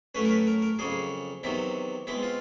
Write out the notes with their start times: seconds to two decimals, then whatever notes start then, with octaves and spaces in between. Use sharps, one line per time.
0.15 A2 F#3 A3 C#4 B4
0.25 A#4
0.31 B4
0.47 A#4
0.62 A#4
0.79 F2 C#3 F#3 A#3 G#4
1.43 E2 C3 D#3 F#3 E4
2.07 B2 G#3 C4 E4
2.23 F4